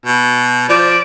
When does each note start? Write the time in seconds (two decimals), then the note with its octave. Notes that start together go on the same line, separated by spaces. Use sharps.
0.06 B2
0.69 F3 D5